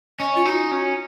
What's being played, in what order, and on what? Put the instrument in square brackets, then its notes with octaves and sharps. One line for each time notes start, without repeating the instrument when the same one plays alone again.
[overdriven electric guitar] C#4 [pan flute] D#5
[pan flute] F4
[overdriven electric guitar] D#4 [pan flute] F#4
[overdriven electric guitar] C#4